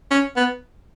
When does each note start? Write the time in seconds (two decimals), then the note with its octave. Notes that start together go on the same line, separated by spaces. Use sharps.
0.11 C#4
0.36 B3